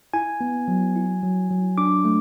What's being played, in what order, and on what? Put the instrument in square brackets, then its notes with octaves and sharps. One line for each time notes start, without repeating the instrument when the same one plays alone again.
[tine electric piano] E4 G#5
B3
F#3
E4
F#3
F#3
D4 D6
A3